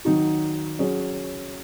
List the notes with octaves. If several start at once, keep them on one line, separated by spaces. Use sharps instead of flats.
D#3 F#3 D#4 F#4
F#3 C#4 G#4